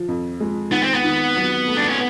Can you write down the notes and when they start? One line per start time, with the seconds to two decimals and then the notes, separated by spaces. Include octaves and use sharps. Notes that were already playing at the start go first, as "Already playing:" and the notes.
Already playing: F3
0.08 F2
0.40 G#3
0.71 D#3 B3
0.83 C4
0.94 B3
1.04 D#3
1.36 F#3
1.67 A3
1.77 D4
1.88 C#4